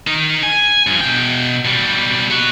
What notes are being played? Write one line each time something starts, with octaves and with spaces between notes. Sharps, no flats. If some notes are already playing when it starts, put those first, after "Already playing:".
D#4 A#4
G#5
G2 F3
B2 G5
B2 G3
B3 F#4